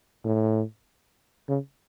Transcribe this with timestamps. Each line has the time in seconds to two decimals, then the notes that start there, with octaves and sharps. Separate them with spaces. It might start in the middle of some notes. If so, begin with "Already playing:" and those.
0.25 A2
1.48 C#3